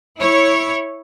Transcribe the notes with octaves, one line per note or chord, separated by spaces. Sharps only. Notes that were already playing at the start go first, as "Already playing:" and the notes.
E4 C#5